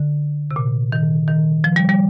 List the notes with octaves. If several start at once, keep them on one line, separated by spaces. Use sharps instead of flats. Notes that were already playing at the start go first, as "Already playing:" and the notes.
Already playing: D3
C3
A#2
D#3
D#3
F3
G3
G3